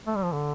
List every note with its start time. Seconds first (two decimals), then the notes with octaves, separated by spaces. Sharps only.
0.07 A3
0.16 G3
0.24 F3
0.32 D3